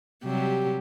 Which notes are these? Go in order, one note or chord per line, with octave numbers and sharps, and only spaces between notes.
C3 F#3 G3 G4